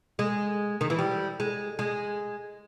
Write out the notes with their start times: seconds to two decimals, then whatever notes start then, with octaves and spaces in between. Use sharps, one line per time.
0.19 G#3
0.81 D#3
0.90 E3
0.99 G3
1.40 G#3
1.79 G#3